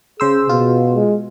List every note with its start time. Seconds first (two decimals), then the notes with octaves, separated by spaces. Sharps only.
0.20 C#3 G#4 C5 E6
0.49 B2 F4
0.94 G#3